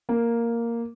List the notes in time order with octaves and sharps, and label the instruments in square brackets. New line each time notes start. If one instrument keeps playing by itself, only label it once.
[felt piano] A#3